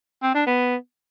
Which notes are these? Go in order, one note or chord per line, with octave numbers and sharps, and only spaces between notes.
C4
D4
B3